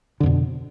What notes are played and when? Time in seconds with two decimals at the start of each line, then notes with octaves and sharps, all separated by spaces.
0.20 D3
0.23 F2
0.26 B2